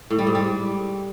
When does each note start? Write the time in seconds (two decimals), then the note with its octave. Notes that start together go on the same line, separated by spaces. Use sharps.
0.10 A2
0.19 G3
0.27 G#2
0.35 G3